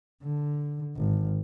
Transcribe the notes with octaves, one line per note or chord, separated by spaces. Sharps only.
D3
G#1